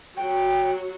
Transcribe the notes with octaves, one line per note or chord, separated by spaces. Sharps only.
F#3 F#4 G5